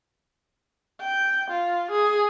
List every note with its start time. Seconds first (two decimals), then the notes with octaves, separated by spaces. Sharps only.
1.01 G5
1.51 F4
1.91 G#4